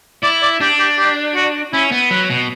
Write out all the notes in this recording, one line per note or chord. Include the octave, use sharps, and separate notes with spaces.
E4 D5
D5
D4 G4
G4
G4
F#4
C#4 E4
B3
F#3 B4
B2